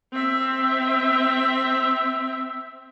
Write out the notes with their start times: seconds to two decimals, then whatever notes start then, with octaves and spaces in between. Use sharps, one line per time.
0.13 C4 E5